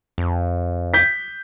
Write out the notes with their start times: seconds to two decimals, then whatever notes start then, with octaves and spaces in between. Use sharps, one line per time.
0.18 F2
0.94 G6 B6